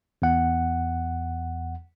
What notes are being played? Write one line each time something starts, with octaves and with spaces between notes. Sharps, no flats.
E2 F#5